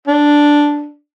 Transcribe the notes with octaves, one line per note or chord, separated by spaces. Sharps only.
D4